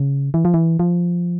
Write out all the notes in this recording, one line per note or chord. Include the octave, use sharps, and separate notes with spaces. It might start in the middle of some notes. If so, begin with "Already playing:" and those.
Already playing: C#3
E3
F3
E3
F3